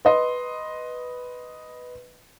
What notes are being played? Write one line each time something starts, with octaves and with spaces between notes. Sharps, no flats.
B4 D#5 C6